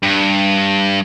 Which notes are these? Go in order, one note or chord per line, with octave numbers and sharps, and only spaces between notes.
G2